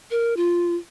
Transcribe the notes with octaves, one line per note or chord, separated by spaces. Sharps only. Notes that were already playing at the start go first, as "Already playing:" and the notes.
A#4
F4